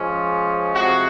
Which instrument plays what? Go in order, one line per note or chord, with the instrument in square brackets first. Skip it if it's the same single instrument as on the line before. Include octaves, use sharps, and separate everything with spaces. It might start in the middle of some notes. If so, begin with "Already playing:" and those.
Already playing: [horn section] F3 G#3 C#4
C3 F3 G#3 F#4